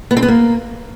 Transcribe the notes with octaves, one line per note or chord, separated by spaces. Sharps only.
B3
C4
B3
A#3